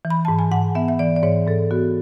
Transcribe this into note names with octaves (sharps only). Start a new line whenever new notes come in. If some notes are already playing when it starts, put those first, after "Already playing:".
E3
B5
G#2 A5
G#5
G#2 F#5
B3 E5
E5
E3 D5
D5
G#2 C#5
G#2 A4
B3 F#4